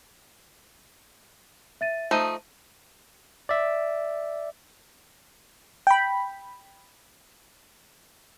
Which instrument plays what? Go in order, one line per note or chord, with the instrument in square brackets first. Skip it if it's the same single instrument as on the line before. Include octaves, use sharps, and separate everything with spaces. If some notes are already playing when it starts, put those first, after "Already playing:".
[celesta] E5 A6 D#7
[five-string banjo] F3 A3 D#4 [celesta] A5 D#7
[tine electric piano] D5 E5
[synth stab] G5 B5